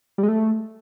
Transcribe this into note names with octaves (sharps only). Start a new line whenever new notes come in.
G3
G#3
A3